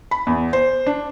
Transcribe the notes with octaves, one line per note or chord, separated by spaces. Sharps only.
B5
E2
C5
D4